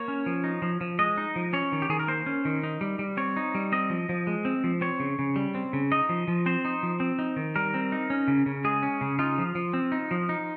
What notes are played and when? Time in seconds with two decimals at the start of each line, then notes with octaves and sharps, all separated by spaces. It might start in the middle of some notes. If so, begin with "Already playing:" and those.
Already playing: A#3 C#5
0.08 C#4
0.26 F3
0.44 D#4
0.62 F3
0.81 F3
0.99 G#3 D#5
1.18 D#4
1.36 F3
1.53 C#4 C#5
1.72 D#3
1.82 G4
1.89 D#3 G#4
1.99 A#4
2.08 A#3 C5
2.26 C#4
2.45 D#3
2.63 D#4
2.81 G3
2.99 G3
3.17 C4 C#5
3.36 D#4
3.55 G3
3.72 C4 D#5
3.90 F3
4.09 F3
4.27 G#3
4.45 C4
4.64 F3
4.81 C4 C#5
5.00 C#3
5.19 C#3
5.36 G3
5.55 C4
5.73 C#3
5.92 D#4 D#5
6.09 F3
6.28 F3
6.46 C4 C5
6.65 D#4
6.83 F3
7.00 C4
7.19 D#4
7.36 D#3
7.56 G3 A#4
7.74 C4
7.92 D#4
8.10 C#4
8.28 C#3
8.46 C#3
8.64 G#3 G#4
8.83 C#4
9.01 C#3
9.19 D#4 F4
9.38 F3
9.55 F3
9.74 C4
9.92 D#4
10.11 F3
10.29 D#4